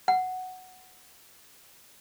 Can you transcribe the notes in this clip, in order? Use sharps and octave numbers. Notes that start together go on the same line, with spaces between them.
F#5